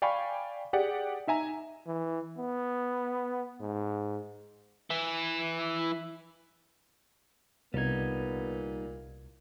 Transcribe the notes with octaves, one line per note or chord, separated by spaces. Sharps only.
D5 F5 G5 G#5 B5 C#6
G4 G#4 D5 F#5
D#4 E5 G#5 A#5
E3
B3
G#2
E3 E4
C2 A#2 G3 B3 D#4 G#6